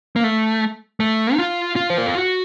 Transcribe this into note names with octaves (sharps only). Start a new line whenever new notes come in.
A#3
A3
A3
D#4
F4
F4
C5
A#4
A4
F#4